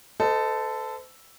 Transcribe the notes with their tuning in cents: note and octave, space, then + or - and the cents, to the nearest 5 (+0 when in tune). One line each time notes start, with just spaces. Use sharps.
A4 +0 C5 -40 D#5 +0